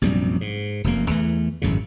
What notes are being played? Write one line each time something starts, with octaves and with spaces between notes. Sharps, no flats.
A#1 F#2 C3 G3
G#2
F1 F#2 B2 A#3
E2 E3 A3
G#1 F#2 A2 C#3